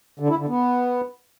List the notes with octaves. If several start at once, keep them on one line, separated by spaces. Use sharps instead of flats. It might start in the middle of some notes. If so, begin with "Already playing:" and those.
D3
E4
D3
B3